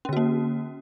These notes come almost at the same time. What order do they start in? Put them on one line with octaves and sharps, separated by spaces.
C#4 D3 F#4 A#3